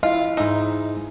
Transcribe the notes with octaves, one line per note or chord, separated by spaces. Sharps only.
E4 F4 D#5
G#2 D#4 E5